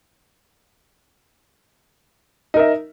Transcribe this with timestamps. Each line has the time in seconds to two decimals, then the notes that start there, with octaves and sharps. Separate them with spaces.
2.54 D#4
2.57 A#4
2.59 E5